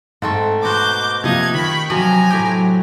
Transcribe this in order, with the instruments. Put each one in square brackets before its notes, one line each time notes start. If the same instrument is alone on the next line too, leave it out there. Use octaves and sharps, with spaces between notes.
[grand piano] G#2 [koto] A3 C4 A4
[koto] B2 F#4 C5 [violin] D6 G6
[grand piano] C3 F3 A#3 [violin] D#4 G#6 [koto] D#5 F#5
[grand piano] D#3 [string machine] G5 C#6 [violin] B5
[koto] C3 F3 C4 [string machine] F#3 [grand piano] F#4 [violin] G#5 A#5
[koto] A2 G4 [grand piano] G6